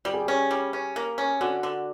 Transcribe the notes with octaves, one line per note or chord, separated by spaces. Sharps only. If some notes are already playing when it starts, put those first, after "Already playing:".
G3 G4
G#4
G4
C#4
G3
C#4
A#3
C#4
D3 F#4
D3